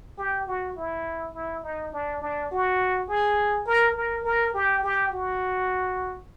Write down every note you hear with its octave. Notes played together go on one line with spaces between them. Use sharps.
G4
F#4
E4
E4
D#4
D4
D4
F#4
G#4
A#4
A#4
A#4
G4
G4
F#4